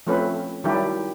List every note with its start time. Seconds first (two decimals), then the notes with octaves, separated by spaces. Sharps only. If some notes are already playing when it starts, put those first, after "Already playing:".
0.07 F3 A3 C4 C#4 B4
0.64 D#3 F#3 G3 D4 E4 G4